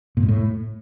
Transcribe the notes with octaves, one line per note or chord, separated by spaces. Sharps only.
A#2
G#2
A2